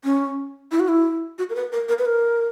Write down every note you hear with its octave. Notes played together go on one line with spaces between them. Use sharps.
C#4
E4
F#4
E4
F#4
A#4
B4
A#4
A#4
B4
A#4